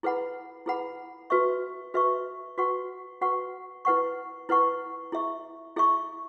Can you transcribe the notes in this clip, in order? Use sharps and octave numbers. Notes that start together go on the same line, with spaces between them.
E4 G#4 B4 F#5 B5
E4 G#4 B4 F#5 B5
F#4 B4 E5 C#6
F#4 B4 E5 C#6
F#4 B4 F#5 C#6
F#4 B4 F#5 C#6
E4 B4 F#5 C#6
E4 B4 F#5 C#6
E4 G#4 E5 C#6
E4 G#4 E5 C#6